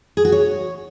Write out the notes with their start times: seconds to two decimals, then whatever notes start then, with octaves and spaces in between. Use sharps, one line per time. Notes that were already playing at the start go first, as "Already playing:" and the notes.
0.17 G#4
0.25 F#4
0.32 C#5